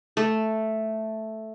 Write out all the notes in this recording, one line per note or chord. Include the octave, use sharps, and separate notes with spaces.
A3